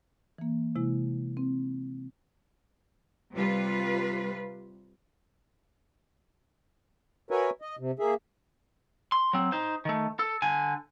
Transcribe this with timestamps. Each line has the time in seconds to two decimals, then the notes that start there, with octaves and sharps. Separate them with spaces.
0.38 E3 A#3
0.76 C3 G#3 E4
1.37 C4
3.34 C3 G3 F4 B4
7.31 F#4 A#4 B4 C#5 E5 G#5
7.62 D#5
7.79 C3
7.99 A#3 G#4 E5
9.12 C6
9.33 F#3 C4
9.52 D#4 C5
9.85 D#3 A3
10.19 A4
10.42 D3 G#5